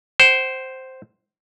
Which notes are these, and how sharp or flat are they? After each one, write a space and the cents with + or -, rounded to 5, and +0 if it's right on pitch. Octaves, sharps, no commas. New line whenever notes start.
C5 +0 F#5 +45